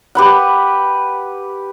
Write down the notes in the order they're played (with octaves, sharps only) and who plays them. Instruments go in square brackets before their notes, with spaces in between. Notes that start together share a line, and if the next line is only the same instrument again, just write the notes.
[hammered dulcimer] G4 B4 F#5